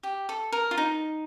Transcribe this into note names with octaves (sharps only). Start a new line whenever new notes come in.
G4
A4
A#4
F4
D#4